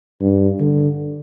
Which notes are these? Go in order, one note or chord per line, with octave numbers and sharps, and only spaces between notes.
G2
D3